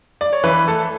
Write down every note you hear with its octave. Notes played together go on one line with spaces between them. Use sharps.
D5
C#5
E3 B4
A3 A4